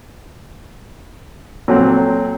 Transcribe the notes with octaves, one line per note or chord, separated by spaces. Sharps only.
A#2 F#3 A3 C4